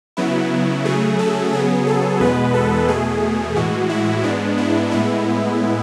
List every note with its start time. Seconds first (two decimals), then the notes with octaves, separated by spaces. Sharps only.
0.17 C#3 F#3 B3 E4
0.85 C#3 F#3 A3 G#4
1.19 A4
1.53 C#3 F#3 B3 G#4
1.87 A4
2.20 E2 B2 G#3 B3 B4
2.54 A4
2.88 E2 B2 A3 G#4
3.56 A2 E3 G#3 F#4
3.89 E4
4.23 G#2 G#3 B3 D4
4.58 E4
4.91 A2 G#3 B3 E4